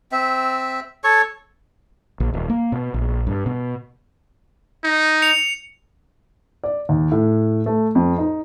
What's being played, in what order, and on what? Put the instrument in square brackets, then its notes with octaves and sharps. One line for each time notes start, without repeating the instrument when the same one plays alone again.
[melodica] C4 E5
A4 C#5 C#6
[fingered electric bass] A#1
D#1
A#3
B2
A#1
G2
B2
[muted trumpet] D#4
[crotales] C#7 F7
[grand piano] D5
D#2
A2
A3
F2
D#4